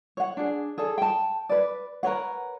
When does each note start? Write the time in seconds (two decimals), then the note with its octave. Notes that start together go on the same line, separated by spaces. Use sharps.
0.17 C#5 F#5
0.37 D4 G#4
0.78 G#4 A4 D5
0.98 G5 A5
1.49 B4 D5
2.03 A#4 B4 C#5 F#5